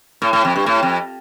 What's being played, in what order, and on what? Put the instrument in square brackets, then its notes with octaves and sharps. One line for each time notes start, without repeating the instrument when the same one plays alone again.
[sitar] A2
A2
F2
G2
A2
F2